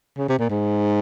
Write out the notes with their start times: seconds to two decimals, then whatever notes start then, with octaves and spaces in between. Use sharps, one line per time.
0.17 C#3
0.29 C3
0.39 A#2
0.50 G#2